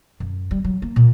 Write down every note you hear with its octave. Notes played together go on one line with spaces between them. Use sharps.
F#2
G3
F#3
A#3
A#2